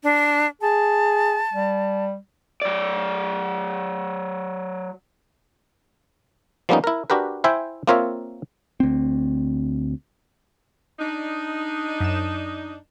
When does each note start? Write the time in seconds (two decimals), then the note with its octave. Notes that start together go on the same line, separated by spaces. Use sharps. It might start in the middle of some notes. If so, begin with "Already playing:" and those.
0.03 D4
0.61 G#4 A5
1.53 G3
2.62 F#3 D5
6.69 F3 G3 A#3 B3 C#4 D#4
6.84 E4 A#4
7.10 D4 F#4 G4 A#4 B4
7.44 E4 C5 E5 G5 G#5
7.88 A#3 C4 F4 A#4 C#5 E5
8.80 D2 C4
10.99 D4 D#4
12.00 F#2 E7